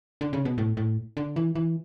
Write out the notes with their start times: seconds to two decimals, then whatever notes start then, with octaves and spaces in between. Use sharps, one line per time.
0.21 D3
0.33 C#3
0.45 B2
0.58 A2
0.77 A2
1.17 D3
1.36 E3
1.55 E3